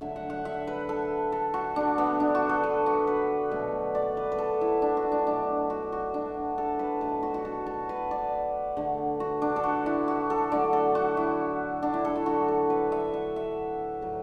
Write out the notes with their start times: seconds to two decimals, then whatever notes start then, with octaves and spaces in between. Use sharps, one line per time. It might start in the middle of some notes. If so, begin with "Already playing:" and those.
0.01 D3 F#3 A3 E5
0.16 F#5
0.30 F#5
0.45 E5
0.67 B4
0.89 A4
1.32 A4
1.54 F#4
1.76 D3 A3 D4
1.98 B3
2.20 D4
2.35 F#4
2.49 A4
2.64 B4
2.86 F#4
3.07 B4
3.51 B2 F#3 A3
3.95 D5
4.17 B4
4.32 B4
4.38 A4
4.61 E4
4.82 D4
4.97 F#4
5.12 D4
5.26 B2 F#3 A3 D4
5.70 F#4
5.92 F#4
6.14 D4
6.58 A4
6.79 B4
7.01 B2 F#3 A3 A4
7.23 F#4
7.34 F#4
7.45 A4
7.66 A4
7.89 B4
8.11 D5
8.77 D3 A3
9.20 F#4
9.42 D4
9.56 A4
9.63 F#4
9.86 E4
10.08 F#4
10.30 A4
10.52 D3 F#3 A3 D5
10.73 A4
10.95 F#4
11.17 E4
11.83 D4
11.94 E4
12.05 A4
12.16 E4
12.26 D3 F#3 A3 F#4
12.48 A4
12.70 B4
12.92 E5
13.14 F#5
13.36 E5
14.02 A2 F#3 A3